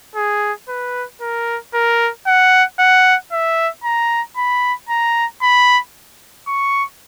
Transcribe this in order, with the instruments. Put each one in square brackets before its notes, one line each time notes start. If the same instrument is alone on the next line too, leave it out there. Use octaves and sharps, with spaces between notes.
[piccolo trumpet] G#4
B4
A#4
A#4
F#5
F#5
E5
A#5
B5
A#5
B5
C#6